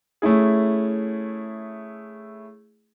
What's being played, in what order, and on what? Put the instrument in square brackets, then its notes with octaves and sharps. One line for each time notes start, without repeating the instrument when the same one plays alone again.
[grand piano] A3 C#4 E4 G#4